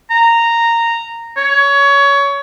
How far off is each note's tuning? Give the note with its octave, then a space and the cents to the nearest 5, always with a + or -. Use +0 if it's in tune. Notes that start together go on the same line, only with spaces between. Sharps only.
A#5 -10
C#5 +20